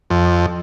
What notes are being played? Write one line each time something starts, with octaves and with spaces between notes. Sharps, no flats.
F2